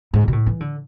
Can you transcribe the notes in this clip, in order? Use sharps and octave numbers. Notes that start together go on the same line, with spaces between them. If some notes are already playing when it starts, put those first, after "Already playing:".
G#2
B2
A2
E3
D3